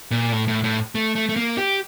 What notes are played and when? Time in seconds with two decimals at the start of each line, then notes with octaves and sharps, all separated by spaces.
0.11 A#2
0.32 A2
0.48 A2
0.64 A2
0.95 A3
1.15 A3
1.29 A3
1.36 A#3
1.58 G4